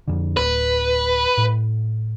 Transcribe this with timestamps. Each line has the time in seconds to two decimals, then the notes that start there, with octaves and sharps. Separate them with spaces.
0.08 F2 D3
0.37 D1 B4
1.38 A2